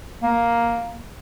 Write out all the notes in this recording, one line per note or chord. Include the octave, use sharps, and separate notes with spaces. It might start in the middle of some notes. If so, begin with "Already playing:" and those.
A#3